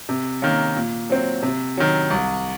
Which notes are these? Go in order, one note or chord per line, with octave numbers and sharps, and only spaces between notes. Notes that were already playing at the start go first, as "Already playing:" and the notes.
C3
D#3 A#3 C#4
A#2
F#3 C4
C3
D#3 F#3
C2